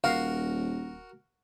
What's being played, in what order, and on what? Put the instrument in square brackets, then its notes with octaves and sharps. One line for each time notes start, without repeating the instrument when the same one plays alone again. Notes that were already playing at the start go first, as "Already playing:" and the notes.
[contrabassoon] D#1 [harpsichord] F#4 A#4 [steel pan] F5